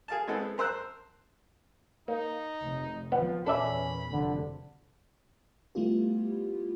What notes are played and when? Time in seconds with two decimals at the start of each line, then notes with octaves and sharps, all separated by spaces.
0.08 G#4 F5 A5
0.28 G#3 B3 C4 E4 A4
0.58 A#4 C5 E6 F#6
2.08 A#3 D#4
2.63 F1
3.12 F3 B3
3.47 E2 A#2 C#4 A4 D5 E5 B5
4.12 F1 F2 D3
5.75 G3 A3 B3 E4 F4 G4